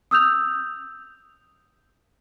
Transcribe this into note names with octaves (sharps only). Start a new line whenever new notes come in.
D#6 E6 G6 F7